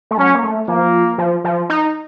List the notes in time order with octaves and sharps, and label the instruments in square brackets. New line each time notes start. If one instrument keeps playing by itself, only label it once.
[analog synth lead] A3
[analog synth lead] F#3 [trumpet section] C#4
[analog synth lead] A#3
A3
[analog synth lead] F3 [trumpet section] A#3
[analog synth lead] F3
F3
D#4